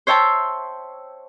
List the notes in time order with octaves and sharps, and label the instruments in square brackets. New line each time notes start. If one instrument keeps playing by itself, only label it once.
[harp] C5 C#5 E5 G5 A5 C6